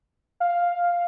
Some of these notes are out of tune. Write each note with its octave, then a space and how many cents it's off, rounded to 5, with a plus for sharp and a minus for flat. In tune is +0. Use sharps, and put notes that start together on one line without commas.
F5 +5